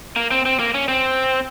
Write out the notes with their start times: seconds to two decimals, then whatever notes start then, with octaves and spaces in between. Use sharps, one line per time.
0.16 A#3
0.31 C4
0.45 C4
0.59 A#3
0.74 C#4
0.88 C4